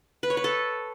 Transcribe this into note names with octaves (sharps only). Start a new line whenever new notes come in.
B4
C#5
B4
A4